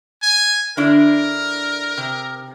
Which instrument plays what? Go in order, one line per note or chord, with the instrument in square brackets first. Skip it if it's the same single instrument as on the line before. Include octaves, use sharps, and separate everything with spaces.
[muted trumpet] G#5
[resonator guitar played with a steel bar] D3 D4 E4 [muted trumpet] A#4
[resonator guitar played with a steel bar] C3